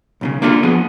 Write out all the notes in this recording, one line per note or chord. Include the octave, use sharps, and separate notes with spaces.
B1 A#2 C#3
A#3 D4 E4 F4 A4
F3 B3 G#4